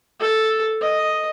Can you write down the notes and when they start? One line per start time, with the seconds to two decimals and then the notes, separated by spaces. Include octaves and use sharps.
0.20 A4
0.81 D#5